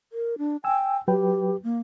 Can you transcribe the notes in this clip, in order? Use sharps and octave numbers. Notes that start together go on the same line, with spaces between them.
A#4
D4
G5 G#5 E6
F#3 G4 B4 G5
A#3